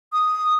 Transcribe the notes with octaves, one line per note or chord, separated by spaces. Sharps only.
D#6